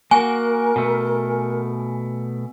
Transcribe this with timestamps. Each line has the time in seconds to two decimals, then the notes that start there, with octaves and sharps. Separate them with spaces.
0.11 A#3 F#4 A#4 G#5
0.76 B2 A3